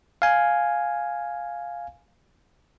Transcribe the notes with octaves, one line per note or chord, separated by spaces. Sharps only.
F5 G#5